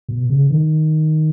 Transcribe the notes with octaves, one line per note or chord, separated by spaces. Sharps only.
B2
C#3
D#3